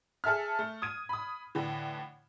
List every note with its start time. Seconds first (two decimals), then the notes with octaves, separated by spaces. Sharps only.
0.24 G#4 A4 E5 F6
0.59 A3
0.82 D#6 G#6 D#7
1.09 B5 D#6
1.55 A2 D3 E3